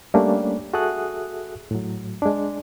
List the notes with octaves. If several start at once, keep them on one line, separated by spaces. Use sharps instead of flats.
G3 A3 A#3 C#4 D4
F#4 G#4 A4 E5 D#6 F#6
A2 F#3
G#3 D4